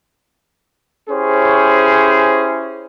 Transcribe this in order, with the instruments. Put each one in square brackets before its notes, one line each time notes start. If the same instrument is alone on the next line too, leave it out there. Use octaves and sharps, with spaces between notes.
[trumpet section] C#4 E4 G4 G#4 C5 C#5